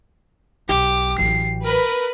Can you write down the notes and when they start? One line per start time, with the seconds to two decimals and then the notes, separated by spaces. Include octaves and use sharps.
0.69 B1 G4 D6
1.18 A1 F#3 C7
1.65 A#4 B4